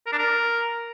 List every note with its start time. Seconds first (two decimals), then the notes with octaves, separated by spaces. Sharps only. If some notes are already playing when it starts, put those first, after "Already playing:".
0.06 A#4
0.12 D4
0.18 A#4